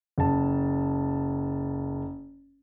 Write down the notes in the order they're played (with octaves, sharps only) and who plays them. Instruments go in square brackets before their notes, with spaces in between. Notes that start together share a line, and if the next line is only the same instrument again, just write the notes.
[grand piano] F#1 A5